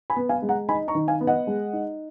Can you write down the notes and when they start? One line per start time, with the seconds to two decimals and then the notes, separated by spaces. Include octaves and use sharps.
0.10 G#5 B5
0.16 B3
0.29 F5 G#5
0.42 G#3
0.49 F#5 A#5
0.69 D#4 G#5 B5
0.88 A#5 C#6
0.95 D#3
1.08 F5 G#5
1.21 B3
1.27 D#5 F#5
1.47 G#3
1.73 D#4